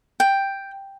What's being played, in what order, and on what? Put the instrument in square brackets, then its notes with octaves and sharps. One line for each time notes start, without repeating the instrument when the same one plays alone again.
[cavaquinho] G5